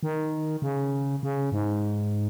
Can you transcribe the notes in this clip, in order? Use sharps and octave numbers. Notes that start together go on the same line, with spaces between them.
D#3
C#3
C#3
G#2